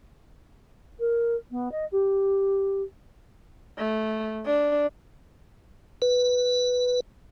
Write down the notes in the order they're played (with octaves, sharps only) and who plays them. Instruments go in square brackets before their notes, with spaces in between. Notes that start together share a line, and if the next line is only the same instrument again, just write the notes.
[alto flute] A#4
B3
D#5
G4
[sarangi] A3
D4
[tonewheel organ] B4